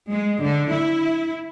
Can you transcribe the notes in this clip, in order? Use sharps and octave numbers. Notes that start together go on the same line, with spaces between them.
G#3
D3
E4